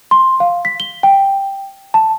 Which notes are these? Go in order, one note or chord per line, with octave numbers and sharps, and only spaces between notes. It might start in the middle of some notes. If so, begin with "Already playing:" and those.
C6
F5
B6
G7
G5
A5